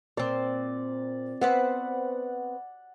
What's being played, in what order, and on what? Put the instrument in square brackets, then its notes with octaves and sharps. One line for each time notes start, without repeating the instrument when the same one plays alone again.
[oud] A#2 C4 [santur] D5
[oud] B3 C4 B4 [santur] F#5